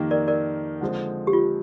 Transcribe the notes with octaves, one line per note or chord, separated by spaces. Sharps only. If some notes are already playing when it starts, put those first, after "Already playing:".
Already playing: F2 D#3 A#3 D#4 G4
A#4 D5
A#4 D5
D3 F3 G#3 C4
G4
F4